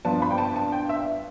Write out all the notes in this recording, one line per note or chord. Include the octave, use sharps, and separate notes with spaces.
G2 F3 B3 D4 A5
B5
G5
A5
A5
G5
E5